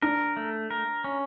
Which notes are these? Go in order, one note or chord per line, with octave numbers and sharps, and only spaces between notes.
D4 A#4
A3
A#4
C#4